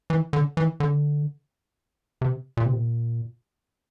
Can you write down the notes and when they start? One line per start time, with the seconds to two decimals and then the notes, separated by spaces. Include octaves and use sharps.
0.10 E3
0.33 D3
0.57 E3
0.80 D3
2.21 C3
2.57 A#2
2.66 C3
2.73 A#2